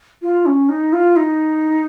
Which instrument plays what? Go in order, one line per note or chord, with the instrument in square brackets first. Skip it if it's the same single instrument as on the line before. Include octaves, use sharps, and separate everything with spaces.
[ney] F4
C#4
D#4
F4
D#4